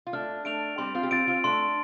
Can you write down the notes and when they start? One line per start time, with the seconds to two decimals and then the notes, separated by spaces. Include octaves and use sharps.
0.07 F4
0.13 A3 D4 F6
0.45 A3 D4 D7 F7
0.78 G3 C4 C6
0.95 C4 F4
1.03 G4
1.11 C4 F4 A6 D7
1.27 C4 F4
1.44 A3 D4 C6